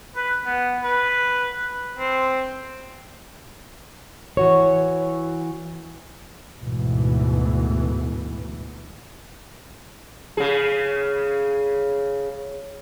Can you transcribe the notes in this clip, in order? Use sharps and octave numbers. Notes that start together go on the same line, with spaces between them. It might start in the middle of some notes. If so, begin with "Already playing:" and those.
B4
B3
B4
C4
E3 F#4 C#5
D2 G#2 B2 E3
C#3 G#4